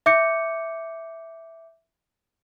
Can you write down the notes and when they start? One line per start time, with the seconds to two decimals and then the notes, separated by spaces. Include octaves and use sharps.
0.06 E5 D6 G6 C#7